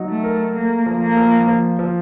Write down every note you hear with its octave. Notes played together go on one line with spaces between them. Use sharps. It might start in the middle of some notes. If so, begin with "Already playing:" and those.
Already playing: F#3 D#4
A3
A#4
A3 A#3
F3
A#3
F3
F3
F3